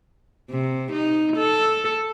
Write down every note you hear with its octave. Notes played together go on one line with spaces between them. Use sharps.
C3
D#4
A4